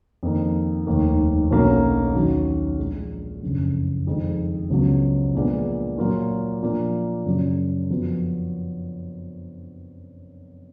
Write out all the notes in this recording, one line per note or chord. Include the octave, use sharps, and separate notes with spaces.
F2 D#3 A#3
F1 D#2 D#3 A#3
B1 B2 F#3 A#3 C#4
D#2 D#3 F#3 C#4 F#4
A#1 A#2 G#3
F#1 F2 C#3
F2 D#3 G#3
C#2 C#3 F#3 B3
A#1 A#2 G#3 B3
A#2 F#3 A#3 F4
A#2 F3 A#3
F#2 C#3 F#3
F2 F3 B3 F#4